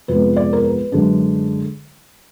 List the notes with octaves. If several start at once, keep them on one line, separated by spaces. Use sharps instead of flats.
F1 F2 F3 G#3 B3 B4
D5
A#4
B4
F#2 D3 G#3 D4